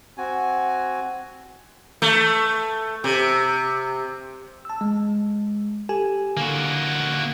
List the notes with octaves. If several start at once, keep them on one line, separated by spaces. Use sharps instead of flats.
C4 F#4 G#5
A3
C3
A5 E6
G#3
G4 A4 G#5
D3 A#3 F#4